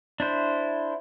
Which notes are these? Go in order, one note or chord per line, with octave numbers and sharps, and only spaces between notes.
D4 E4 C5